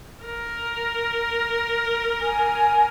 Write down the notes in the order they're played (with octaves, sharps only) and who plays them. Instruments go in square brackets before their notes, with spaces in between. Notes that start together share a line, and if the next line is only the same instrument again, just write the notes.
[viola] A#4
[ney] G#5